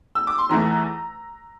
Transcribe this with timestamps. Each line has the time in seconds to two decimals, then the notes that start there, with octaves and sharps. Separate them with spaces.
0.15 E6
0.27 D6
0.38 C6
0.49 E2 E3 A3 A#5